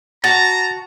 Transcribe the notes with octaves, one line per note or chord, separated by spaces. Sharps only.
F#4 A5 A#5 A6